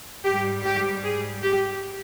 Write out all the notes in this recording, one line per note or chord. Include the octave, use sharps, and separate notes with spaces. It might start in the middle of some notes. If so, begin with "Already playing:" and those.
G#2 G3 G4
G4
G#4
G4